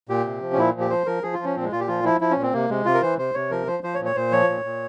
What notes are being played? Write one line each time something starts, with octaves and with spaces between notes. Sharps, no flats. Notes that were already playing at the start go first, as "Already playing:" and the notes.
A#2 G4
C3
F3
C#4
A#2 E4
F3
G4
F3 C5
F3 A#4
F3 G#4
F4
F3
C#4
A#2 C4
G#3
A#2 F4
G4
F3 F4
F3 E4
F3 E4
C#4
A#2
C4
C3 A#3
C3 G#3
C3 F4
A#4
E3 C5
C3 C5
C3 C#5
F3 A#4
F3 C5
F3 C5
C#5
A#2
C#5
A#2 C5
F3 C#5
A#2
A#2